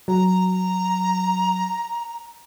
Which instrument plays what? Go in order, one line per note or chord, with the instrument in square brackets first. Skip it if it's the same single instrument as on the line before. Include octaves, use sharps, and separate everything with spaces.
[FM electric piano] F#3 [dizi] A#5